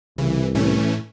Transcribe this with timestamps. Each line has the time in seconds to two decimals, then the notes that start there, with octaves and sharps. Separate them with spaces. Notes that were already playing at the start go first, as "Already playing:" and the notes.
0.18 C2 C#3 E3
0.55 A2 E3 A3 C#4